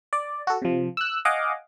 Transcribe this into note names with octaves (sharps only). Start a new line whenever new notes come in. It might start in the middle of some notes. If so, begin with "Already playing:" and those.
D5
F#4 A4
C3 F3
E6 F#6
D#5 F5 F#5 G#5 D6